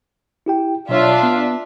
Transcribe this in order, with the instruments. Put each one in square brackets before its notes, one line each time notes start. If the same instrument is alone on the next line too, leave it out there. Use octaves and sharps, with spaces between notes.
[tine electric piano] E4 G4 G5
[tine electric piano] B2 F#3 C#5 [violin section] D4 F4 E5
[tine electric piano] B3